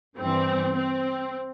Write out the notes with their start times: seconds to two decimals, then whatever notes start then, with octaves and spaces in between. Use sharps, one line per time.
0.20 G2 E3 C4
0.76 C4